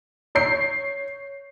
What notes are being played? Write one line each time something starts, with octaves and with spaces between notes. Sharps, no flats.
C#5 G6 C7